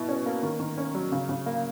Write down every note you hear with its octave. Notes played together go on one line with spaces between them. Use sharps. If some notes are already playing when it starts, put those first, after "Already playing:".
Already playing: B2 E4
C#4
A#3
D#3
D#3
C#4
F#3
C#3
C#3
A#3